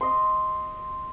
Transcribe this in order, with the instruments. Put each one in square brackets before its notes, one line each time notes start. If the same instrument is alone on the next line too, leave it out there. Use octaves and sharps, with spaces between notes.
[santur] D#5 C6